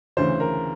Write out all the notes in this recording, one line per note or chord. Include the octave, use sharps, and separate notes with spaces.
D2 C#3 E3 C5
A#4